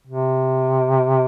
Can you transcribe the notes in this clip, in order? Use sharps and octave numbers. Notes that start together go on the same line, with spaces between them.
C3